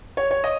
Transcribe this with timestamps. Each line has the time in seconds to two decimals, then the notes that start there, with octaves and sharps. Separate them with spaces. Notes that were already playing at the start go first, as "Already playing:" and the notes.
0.17 C#5
0.31 C#5
0.44 D#5